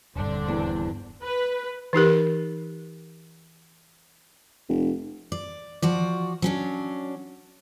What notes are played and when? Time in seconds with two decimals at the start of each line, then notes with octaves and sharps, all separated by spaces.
0.15 D#1 G2 D3 C4 D4
0.48 E2
1.23 B4
1.93 E3 D#4 G4 A#4
4.69 F1
5.32 D5
5.82 F3 F#4 D5
6.42 F#3 C#4 D4